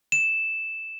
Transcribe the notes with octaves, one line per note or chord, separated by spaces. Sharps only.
E7